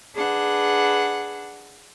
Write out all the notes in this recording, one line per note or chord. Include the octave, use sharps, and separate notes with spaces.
D4 G#4 B4 F#5